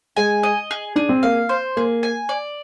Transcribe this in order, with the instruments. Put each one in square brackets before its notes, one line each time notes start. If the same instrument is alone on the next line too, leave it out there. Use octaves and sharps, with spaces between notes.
[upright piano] G#3 [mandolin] G#5
[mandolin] D#5
G#4
[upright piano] D4 [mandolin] G#4
[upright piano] C4
[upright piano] A#3 [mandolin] F5
[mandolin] C5
[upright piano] A#3 [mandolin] G#4
[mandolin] G#5
D5